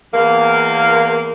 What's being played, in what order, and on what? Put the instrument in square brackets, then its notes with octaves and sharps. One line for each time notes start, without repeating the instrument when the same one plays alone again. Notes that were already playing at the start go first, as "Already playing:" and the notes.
[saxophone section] E2 A#3